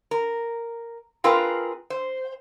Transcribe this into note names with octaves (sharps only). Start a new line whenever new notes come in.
A#4
C4 F4 G#4 A#4 B4
C5